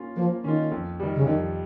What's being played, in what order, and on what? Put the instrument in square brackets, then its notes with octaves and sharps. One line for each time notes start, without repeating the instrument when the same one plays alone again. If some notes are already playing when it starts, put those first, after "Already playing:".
Already playing: [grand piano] A#3 C#4 F4
[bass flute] F3 [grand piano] A#3
[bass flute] D#3 [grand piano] C#4 F4
[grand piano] F2
D#3 G3
[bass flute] C#3
[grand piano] F2 [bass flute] D#3